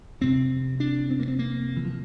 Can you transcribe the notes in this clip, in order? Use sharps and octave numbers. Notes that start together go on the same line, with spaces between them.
F2 C3 C4
D4
C4
A#3
C4
A#3
E3
F3